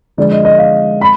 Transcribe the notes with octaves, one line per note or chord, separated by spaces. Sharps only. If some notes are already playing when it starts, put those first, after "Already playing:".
D3 F3 G#3 D5
D#5
D#5
F5
B5